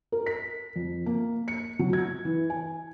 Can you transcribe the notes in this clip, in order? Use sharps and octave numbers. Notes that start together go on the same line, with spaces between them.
A#4
B6
F2
A#3
C#7
F#3
G#6
E3
G#5